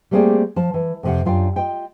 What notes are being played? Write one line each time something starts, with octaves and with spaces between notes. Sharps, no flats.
G3 A3 A#3 C4 G#4 D5
F3 A5
E3
F2 C3 F#5
F#2 D4 F4 G5
F4 D#5 G5